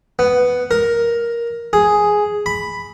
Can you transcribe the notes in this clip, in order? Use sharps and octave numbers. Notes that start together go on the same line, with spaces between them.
B3
A#4
G#4
B5